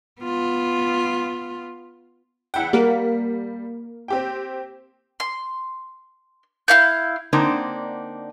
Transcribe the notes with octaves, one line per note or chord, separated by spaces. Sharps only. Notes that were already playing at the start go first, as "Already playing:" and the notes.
B3 F4
E2 E4 F#5 G5
G3 A#3 A#4
C4 G4 G5
C6
E4 F5 G6
D3 A#3 C4 D4 D#4